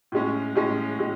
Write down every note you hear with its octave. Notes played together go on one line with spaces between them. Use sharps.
A2 G#3 C#4
A2 G#3 C#4
A2 G#3